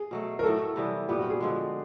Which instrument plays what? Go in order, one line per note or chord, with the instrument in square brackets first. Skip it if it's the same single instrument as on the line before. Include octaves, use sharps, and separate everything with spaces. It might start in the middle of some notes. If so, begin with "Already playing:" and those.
Already playing: [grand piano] G#4
[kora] B2 F#3 A3
[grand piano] A#4
[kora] A2 F#3 A3 [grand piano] A4
[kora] C3 E3 G3 B3
[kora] A#2 G3 B3 [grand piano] G4
[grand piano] F#4
G#4
[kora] D3 F3 G#3